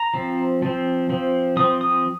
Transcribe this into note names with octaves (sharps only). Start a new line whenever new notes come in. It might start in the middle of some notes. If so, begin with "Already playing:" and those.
Already playing: A#5
F3 C4
F3 C4
F3 C4
F3 C4 D#6
D#6